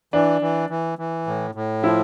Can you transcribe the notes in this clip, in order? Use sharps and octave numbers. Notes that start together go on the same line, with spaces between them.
E3 D4
E3
E3
E3
A2
A2
F3 E4